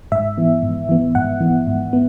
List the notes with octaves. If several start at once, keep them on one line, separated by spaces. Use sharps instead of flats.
G#2 E5
E3 B3
G#2
E3 B3
G#2 F#5
E3 B3
G#2
B3